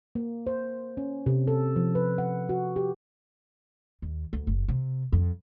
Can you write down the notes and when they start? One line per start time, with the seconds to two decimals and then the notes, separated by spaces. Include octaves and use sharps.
0.15 A#3
0.47 C5
0.97 C#4
1.26 C3
1.47 A4
1.76 F3
1.95 B4
2.18 F#5
2.49 F#4
2.76 G4
4.02 D#2
4.33 D2
4.47 F#1
4.68 C3
5.12 F2